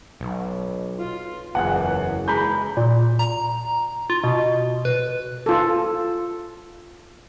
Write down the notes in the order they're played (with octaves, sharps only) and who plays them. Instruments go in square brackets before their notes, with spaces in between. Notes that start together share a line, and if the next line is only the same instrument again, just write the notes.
[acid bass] B1
[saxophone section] F4
[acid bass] F#1 [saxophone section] E2 [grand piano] F#5 G#5 F#6
[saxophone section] G#3 [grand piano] A#5 B5 G6
[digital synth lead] A#2
A#5
F4
B2
B4
[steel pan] F4 A4